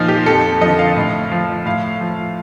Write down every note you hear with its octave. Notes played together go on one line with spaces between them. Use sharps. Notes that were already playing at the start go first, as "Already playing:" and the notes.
Already playing: A#2 F3 D#4 F4
G4
F2 A4
D3 F3 D#5
F5
A2
F3
A2 F5
F3